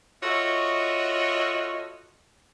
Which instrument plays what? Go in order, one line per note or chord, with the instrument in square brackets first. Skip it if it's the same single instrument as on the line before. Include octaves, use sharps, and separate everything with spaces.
[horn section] F4 F#4 A4 C#5 D#5 E5